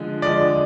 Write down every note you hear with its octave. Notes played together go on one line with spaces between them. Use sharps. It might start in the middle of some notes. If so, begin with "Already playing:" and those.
Already playing: D3 F3 G#3
D3 F3 G#3 D5